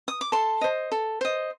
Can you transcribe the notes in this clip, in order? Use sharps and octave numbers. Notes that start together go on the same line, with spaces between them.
D#6
D6
A4 A5 C6
C5 D#5
A4
C5 D#5